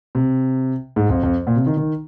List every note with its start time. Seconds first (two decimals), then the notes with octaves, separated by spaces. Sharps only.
0.15 C3
0.96 G#2
1.09 F2
1.23 F2
1.47 A#2
1.56 C3
1.66 D#3
1.77 D#3